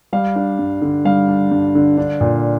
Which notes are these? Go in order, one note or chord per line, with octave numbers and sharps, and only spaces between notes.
G3 F5
D4
G2
D3
G3 F5
D4
G2
D3
D4
A#2